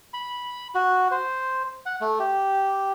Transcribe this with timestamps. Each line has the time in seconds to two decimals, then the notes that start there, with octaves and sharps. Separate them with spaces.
0.14 B5
0.75 F#4
1.11 C5
1.86 F#5
2.01 A3
2.19 G4